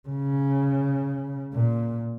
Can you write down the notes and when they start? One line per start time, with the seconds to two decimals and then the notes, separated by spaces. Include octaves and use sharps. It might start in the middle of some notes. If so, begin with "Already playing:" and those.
0.09 C#3
1.53 A#2